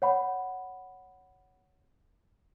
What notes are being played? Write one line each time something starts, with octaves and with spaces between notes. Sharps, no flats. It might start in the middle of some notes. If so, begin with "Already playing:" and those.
C#5 F#5 B5